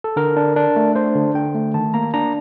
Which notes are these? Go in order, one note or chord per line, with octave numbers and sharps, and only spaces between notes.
A4
D3 A#4
D4
D4
A3
D4 C5
D3
D3 G5
A3
D#3 A5
A#3 A#5
D4 A#5